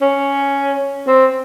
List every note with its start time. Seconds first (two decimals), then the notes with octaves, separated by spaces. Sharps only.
0.02 C#4
1.07 C4